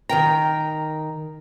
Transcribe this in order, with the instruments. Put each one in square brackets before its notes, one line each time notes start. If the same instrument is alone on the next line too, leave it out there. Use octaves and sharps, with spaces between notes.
[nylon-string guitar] D#3 A#4 G5 [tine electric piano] A#5